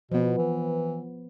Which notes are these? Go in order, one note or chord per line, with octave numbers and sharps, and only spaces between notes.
B2 F3 B3
E3